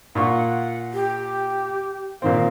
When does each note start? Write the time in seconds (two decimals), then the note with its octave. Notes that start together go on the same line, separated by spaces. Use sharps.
0.15 A#2 F4 F#5 C#6
0.94 G4
2.22 A#2 D#3 C4 F5